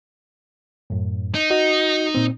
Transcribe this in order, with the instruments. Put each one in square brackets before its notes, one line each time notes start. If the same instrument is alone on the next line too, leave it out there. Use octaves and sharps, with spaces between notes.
[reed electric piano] F#2 A2
[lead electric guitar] D#4
[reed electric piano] F#4 D#5
A#2 C4